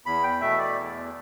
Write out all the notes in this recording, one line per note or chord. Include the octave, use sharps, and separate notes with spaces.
E2 B5
G5
B2 A3 E5
D5
E2